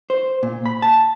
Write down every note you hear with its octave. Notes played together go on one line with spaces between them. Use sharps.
C5
A#2
B5
A5